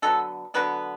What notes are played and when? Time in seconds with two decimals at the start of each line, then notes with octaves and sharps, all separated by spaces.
0.02 D3 F#3 B3 A4
0.54 D3 F#3 B3 B4